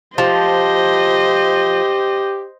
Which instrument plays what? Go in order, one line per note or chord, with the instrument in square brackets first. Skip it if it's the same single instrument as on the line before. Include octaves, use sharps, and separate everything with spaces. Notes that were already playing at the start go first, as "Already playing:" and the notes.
[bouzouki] F3 [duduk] G4 [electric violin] C5 D#5